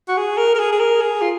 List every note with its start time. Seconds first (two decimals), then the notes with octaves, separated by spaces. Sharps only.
0.08 F#4
0.17 G#4
0.37 A#4
0.55 A#4
0.59 G#4
0.72 G#4
0.80 A#4
1.01 G#4
1.21 F4